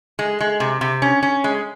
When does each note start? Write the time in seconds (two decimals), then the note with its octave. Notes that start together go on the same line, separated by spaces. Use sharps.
0.19 G#3
0.40 G#3
0.60 C3
0.81 C3
1.02 C#4
1.23 C#4
1.44 G#3